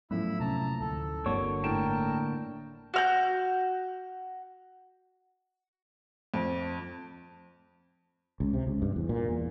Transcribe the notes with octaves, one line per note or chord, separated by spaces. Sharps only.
F#2 A2 F3 B3 E4 B5 E6
C3 A#3 C#4 A5 A#5
D2 A4
G1 D3 G3 A#3 C4 F#4 C#5
A2 A#4 G5 A5 D7 E7
F#4 F6 G6
F2
C#2
C3
C#2
G2
E2
A#2
E2